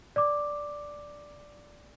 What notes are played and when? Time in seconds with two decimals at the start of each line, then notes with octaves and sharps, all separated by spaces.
0.16 D5 D6